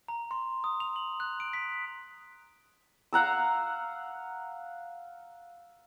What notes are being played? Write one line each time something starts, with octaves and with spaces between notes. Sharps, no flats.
A#5
C6
D#6
F7
F#7
F#6
D7
B6
F5 F#5 A#5 E6